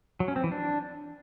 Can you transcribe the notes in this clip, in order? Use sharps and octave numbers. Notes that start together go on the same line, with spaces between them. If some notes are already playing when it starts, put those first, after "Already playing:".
F#3
C#4
C4
E3
D4